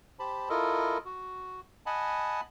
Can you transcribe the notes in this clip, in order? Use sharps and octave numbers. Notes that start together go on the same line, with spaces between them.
G4 C5 A5 B5
E4 F4 A4 A#4 D#5
F#4
D#5 F#5 G#5 A5 B5